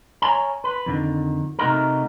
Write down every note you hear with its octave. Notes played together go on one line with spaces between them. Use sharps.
C#5 D5 G#5 A#5
B4
F2 D3 D#3
C3 A3 D#4 F#4 A#4